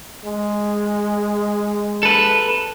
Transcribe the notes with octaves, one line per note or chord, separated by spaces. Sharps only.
G#3
A4 B4